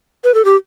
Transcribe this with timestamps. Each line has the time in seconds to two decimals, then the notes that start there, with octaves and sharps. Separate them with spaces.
0.24 B4
0.34 A4
0.45 G4